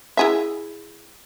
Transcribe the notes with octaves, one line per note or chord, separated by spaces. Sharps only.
E4 G#4 E5